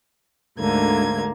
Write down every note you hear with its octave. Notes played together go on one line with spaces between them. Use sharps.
D2 G#2 D3 A#3 G#6